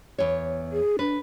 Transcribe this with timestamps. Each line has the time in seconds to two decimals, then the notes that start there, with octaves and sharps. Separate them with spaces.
0.18 E2 C#5
0.72 G#4
0.99 D4 B4